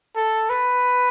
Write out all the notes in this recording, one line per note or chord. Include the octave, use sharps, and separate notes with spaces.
A4
B4